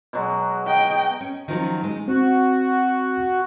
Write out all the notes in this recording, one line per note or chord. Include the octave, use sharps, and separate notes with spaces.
B2 F#3 G#3
D#5 G5
C#4
D#3 F3 F#3 C#4
G#3 D#4
C4 F#4